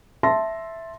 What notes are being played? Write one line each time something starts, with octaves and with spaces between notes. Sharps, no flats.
E5 A5 C6 A#6